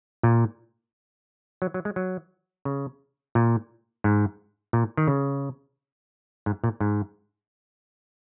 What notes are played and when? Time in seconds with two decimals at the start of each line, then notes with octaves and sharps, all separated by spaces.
0.23 A#2
1.62 F#3
1.74 F#3
1.85 G#3
1.96 F#3
2.65 C#3
3.35 A#2
4.04 G#2
4.73 A#2
4.97 D#3
5.07 C#3
6.46 G#2
6.64 A#2
6.80 G#2